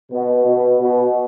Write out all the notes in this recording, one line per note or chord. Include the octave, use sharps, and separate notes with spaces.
B2
B2
B2